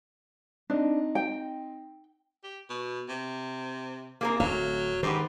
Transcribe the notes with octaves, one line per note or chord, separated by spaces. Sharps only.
C4 D4 D#4
G5
G4
B2
C3
C3 A#3 G#4 A#4
D1 F#3 A3 F5
G#2 D#3 B3 G4 C5